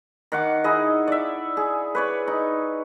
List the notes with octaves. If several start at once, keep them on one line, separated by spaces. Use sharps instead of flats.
D#3 F#5 D6
D#4 E4 G#4 D#5
D5 E5
G#4
B4 C#5 D5
D#4